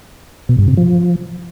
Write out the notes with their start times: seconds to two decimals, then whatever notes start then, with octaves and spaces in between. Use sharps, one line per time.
0.49 B2
0.58 G2
0.68 C3
0.77 F3